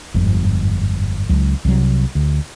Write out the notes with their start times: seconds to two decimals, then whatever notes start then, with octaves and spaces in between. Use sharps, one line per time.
0.14 G1 F2 G#2
1.29 C#2 F#3
1.65 C2 C3 F3 F#3
2.15 D2